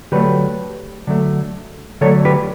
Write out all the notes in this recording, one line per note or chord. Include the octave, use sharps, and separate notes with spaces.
D3 F#3 A3 G4 B4
D3 F#3 A3
D3 F#3 A3 A4 C#5
G4 B4